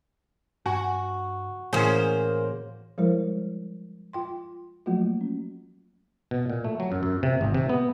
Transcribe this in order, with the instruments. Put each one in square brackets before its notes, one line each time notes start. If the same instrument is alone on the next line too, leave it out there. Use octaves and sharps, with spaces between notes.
[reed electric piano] G2 [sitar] F#4 [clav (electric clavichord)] G#5
[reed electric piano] A2 E3 [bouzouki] A#3 C5 [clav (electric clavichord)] C#4 G#4
[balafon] F3 G3 G#3 E4 A#4 C5
F4 G5 C6
F3 F#3 A3 A#3 F4 F#4
C#4
[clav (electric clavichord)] B2
A#2
A3
F#3
F#2
F#2
C3
G#1
C3
B3